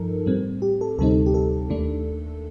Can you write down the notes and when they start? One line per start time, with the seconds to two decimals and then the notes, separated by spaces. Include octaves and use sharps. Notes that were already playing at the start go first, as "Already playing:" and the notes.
Already playing: G2 F3 D#4 A4 A#4
0.26 A2 G3 C4
0.62 G4
0.81 A4
0.98 D2 C3 G3 C4 D#4 A4
1.26 G4
1.34 A4
1.70 D#2 D#3 A3 D4